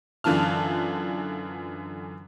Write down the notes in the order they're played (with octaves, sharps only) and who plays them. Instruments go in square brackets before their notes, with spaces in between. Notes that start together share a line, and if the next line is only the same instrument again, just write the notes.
[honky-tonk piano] F#2 D3 E3 F4 A5 F6